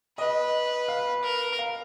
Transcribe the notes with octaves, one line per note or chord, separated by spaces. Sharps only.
B4 D#5
F5
A#4
F5